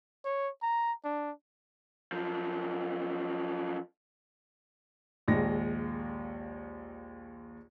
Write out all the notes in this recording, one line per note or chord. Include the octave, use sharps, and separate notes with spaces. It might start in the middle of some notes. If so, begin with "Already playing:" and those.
C#5
A#5
D4
F#2 F3
A#1 D#2 G#3 A#6